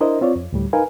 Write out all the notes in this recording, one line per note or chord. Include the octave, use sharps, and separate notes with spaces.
D4 E4 A#4 C5 D#5
C4 F4 C#5 D5
F2
D2 A2 G3
D#4 A#4 B4 F5 G#5